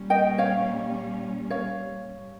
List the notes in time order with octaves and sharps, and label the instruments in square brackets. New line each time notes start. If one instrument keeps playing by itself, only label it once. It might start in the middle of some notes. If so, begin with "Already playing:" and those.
Already playing: [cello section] A#2 G3 A#3 C#4
[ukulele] D#5 G5
C#5 F5
C#5 F5
[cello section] G#2 G3 C#4